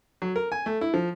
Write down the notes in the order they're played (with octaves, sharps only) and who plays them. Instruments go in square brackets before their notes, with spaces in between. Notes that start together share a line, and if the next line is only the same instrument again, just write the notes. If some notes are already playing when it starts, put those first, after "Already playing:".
[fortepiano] F#3
A#4
G#5
A3
E4
F3